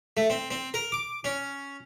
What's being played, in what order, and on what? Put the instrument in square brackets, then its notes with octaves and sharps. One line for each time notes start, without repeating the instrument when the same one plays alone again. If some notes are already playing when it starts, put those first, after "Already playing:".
[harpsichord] A3
C4
C4
A#4
D6
C#4